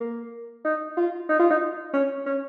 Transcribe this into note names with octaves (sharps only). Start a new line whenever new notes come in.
A#3
D#4
F4
D#4
F4
D#4
C#4
C#4